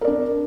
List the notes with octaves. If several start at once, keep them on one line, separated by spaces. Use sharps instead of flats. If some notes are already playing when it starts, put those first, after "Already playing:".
D4 A#4 D5